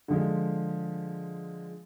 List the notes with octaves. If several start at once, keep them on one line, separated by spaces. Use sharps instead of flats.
D3 F3 G#3